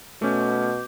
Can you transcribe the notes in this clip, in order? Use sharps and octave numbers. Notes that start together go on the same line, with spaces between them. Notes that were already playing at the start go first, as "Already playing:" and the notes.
B2 A3 C#4 D6 G6